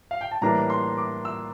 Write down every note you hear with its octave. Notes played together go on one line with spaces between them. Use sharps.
F5
G5
A5
A2 E3 G3 A#3 D4 A#5
C6
D6
E6